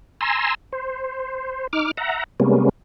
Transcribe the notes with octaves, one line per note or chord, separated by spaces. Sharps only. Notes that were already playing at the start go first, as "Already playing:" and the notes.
G#5 A#5 C6 E6
C5
D#4 D6 F6
E5 F#5 A#5
C3 G3 G#3 A#3 B3 C#4